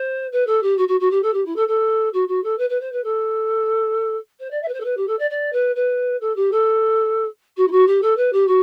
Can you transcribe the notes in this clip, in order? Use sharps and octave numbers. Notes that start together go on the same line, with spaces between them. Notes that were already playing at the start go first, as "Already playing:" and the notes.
Already playing: C5
B4
A4
G4
F#4
F#4
F#4
G4
A4
G4
E4
A4
A4
F#4
F#4
A4
B4
B4
C5
B4
A4
C5
D5
E5
B4
C5
A4
B4
G4
A4
D5
D5
B4
B4
A4
G4
A4
F#4
E4
F#4
G4
A4
B4
G4
F#4